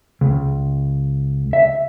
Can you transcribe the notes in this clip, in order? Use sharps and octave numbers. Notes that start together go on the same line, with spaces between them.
C#2
E5